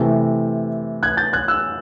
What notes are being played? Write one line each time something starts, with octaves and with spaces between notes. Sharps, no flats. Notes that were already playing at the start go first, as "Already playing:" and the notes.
Already playing: C3 E3 A3
F#6 G#6
G6 A6
F#6 G#6
E6 F#6